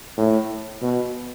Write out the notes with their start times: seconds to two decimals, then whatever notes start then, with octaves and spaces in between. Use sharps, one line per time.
0.18 A2
0.82 B2